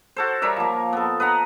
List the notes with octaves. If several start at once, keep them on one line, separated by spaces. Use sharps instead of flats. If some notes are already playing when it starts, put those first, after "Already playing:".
F#4 A4 C5
G3 A#4 C#5 E5
F3 A#3
B3 A4
B4 D#5 F#5 A#5